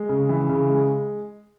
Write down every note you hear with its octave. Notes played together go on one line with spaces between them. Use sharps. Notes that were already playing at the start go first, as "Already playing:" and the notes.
Already playing: G#3
C#3
E3
C#3
G#3